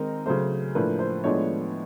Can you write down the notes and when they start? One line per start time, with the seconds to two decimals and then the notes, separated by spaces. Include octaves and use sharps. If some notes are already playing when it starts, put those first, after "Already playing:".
Already playing: D#3 G#3 C4 D#4 A#4
0.26 C#3 F#3 A3 C5
0.75 A2 F3 A#3 D4 B4
0.99 C5
1.24 A2 F3 G#3 B3 D4 C#5